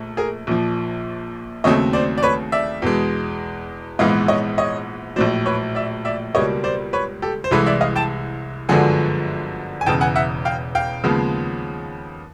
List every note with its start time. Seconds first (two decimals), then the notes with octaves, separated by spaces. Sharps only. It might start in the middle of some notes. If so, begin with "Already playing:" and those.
Already playing: A#1 A3
0.17 G#4 A#4
0.47 A#1 A#2 F3
1.64 D#2 C#3 F#3 A3 C4 C#5 D#5
1.93 C5 D5
2.18 D5
2.23 B4 C#5
2.52 D5 E5
2.82 E2 B2 G#3
3.99 A#1 G#2 E3 G#3 B3 D#5 F5
4.28 C#5 D#5
4.58 C#5 D#5
5.16 A#1 A2 F#3 C5 D5
5.46 B4 C#5
5.75 D5 E5
6.05 D5 E5
6.35 C#2 B2 G3 A#3 C#5 D#5
6.64 C5 D5
6.93 B4 C#5
7.22 G4 A4
7.44 C5
7.51 C2 C3 E3 G#3 A4 B4
7.66 D5 E5
7.81 D#5 F5
7.96 G5 A5
8.69 G1 F#2 D3 F3 G#3 F#5 G#5
9.81 G#5
9.86 E1 E2 C#3 G5 A5
10.01 F#5 G#5
10.16 E5 F#5
10.45 F5 G5
10.75 F5 G5
11.04 D#2 C#3 F3 G#3 B3